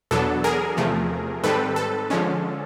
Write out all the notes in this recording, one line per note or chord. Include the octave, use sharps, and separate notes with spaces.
E2 B2 F#3 B3 D4 A4
G#4 A#4
E2 C3 F3 A3
G#2 D#3 G3 C4 A4 B4
A4
D3 F3 G#3 C#4